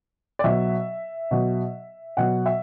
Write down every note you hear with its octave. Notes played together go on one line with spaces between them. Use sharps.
D5
B2 F#3 E5
B2 F#3
B2 F#3 F#5
E5